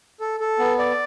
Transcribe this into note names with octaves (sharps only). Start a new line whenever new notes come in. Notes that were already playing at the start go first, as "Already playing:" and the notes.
A4
A4
B3
D5